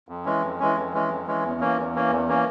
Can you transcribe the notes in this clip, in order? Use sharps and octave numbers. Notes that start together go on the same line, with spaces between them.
F2
E3 G#3 C#4
F2
E3 G#3 C#4
F2
E3 G#3 C#4
F2
E3 G#3 C#4
E2
E3 A#3 C#4
E2
E3 A#3 C#4
E2
E3 A#3 C#4